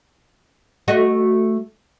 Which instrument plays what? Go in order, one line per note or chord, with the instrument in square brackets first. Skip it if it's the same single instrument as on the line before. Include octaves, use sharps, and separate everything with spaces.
[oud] A3 F#4 D#5